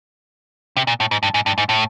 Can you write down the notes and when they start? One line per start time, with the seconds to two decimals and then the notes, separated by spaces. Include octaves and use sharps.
0.77 C3
0.87 A#2
1.00 A2
1.11 G#2
1.23 G2
1.34 G#2
1.46 G2
1.58 G#2
1.69 A2